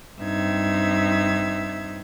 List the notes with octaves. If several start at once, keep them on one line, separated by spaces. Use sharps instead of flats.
G2 C4 D#4 E5 G#6